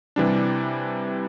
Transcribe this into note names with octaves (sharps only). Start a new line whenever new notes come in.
C3 E3 G3 D4